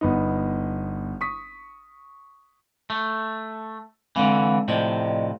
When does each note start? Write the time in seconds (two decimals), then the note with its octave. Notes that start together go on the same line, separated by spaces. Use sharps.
0.01 G1 B3 D#4
1.21 C#6 D#6 B6
2.90 A3
4.16 D3 E3 G#3 C4 F5
4.68 A2 C3 F3 D5 D#5